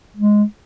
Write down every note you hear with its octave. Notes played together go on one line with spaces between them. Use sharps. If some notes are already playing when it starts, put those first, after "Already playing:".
G#3